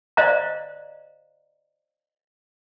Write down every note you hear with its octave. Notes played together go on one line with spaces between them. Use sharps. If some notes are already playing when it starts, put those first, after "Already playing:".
C5 D5 D#5 F5 A#5